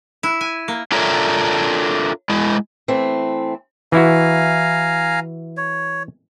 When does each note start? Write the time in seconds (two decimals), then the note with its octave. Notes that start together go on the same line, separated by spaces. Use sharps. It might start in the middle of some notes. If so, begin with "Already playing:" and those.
0.23 E4
0.41 G#5
0.68 A#3
0.92 D4 F4 A4 A#4 C#5 E5
2.30 G#3 E4
2.88 E3 A3 C4
3.92 E3 E4 F#4 F5 G#5 A#5
5.57 C#5